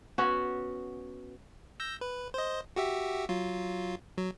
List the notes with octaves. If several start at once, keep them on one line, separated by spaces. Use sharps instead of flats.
B3 C#4 F#4
E6 G6 A#6
B4
C5 D#5
F#4 G4 E5
F#3 F4
F#3